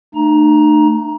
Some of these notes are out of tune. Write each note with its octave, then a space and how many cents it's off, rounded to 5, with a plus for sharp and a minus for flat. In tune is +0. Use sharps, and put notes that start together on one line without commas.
A3 +30 D#4 -45 A#5 +15